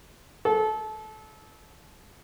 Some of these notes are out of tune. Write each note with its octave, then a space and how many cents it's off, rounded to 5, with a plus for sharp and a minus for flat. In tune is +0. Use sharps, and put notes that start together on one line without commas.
A4 -25